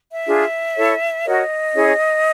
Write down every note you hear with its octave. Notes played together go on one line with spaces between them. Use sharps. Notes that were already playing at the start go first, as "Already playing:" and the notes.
E5
D4 F4 G#4
E4 A4 C#5
F#4 A#4 C#5 D#5
C#4 E4 G#4 C#5